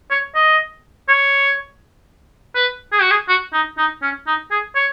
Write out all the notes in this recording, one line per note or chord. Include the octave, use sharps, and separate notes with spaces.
C#5
D#5
C#5
B4
G#4
F#4
G#4
F#4
D#4
D#4
C#4
D#4
G#4
C#5